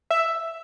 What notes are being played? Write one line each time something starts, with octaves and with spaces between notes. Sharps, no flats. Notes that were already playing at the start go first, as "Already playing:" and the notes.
E5